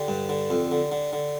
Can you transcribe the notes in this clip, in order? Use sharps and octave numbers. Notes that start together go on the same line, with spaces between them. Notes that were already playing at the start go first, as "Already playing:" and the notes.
Already playing: D3 G4
G2
D3
F2
D3
D3
D3